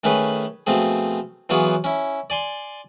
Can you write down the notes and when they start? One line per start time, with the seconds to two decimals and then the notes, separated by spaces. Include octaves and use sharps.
0.04 D#3 A3 C#4 G#4 B4 C#5
0.67 B2 F3 A3 C4 G#4
1.49 E3 F#3 B3 F4 G#4 C#5
1.84 C#4 E4
2.30 D5 G#5 C6